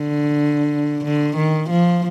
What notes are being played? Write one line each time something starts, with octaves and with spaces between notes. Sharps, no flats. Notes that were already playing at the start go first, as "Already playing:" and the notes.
Already playing: D3
D3
D#3
F3